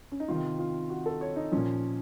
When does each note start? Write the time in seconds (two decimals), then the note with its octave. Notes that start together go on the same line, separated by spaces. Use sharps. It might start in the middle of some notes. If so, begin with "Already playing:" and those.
0.12 C#4
0.20 D#4
0.28 C3 D#3 F4
0.59 F4
0.90 F#4
1.06 A4
1.21 C#5
1.36 D#4
1.52 A#2 F3 C#4